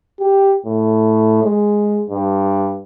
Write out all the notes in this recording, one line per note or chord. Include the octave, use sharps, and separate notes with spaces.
G4
A2
G#3
G2